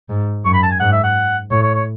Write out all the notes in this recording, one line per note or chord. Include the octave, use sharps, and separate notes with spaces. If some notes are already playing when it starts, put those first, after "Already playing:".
G#2
F#2 C#6
B5
A5
G#5
G#2 F#5
E5
F#5
A2 C#5
C#5
C#5